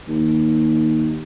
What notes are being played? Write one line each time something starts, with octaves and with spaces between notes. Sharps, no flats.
D#2